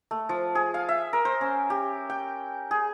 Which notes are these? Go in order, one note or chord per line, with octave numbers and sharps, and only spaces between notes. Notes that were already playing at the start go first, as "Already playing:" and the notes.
A3
F3
G#4
F5
E5
A#4
C5
C#4
G4
G5
G#4